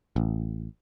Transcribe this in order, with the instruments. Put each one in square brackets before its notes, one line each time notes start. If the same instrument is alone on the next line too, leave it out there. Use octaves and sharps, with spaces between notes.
[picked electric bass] A1